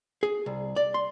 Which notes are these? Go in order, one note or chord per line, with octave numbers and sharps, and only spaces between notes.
G#4
C2
D5
C6